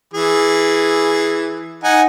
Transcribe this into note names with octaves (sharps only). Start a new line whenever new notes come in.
E3 G#4
D#4 F#5 G#5